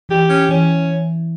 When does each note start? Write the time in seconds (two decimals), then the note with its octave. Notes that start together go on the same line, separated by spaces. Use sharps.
0.09 E3 G4
0.29 C#4
0.49 E3 C#4